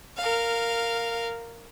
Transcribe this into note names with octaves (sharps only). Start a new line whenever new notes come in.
A#4 F5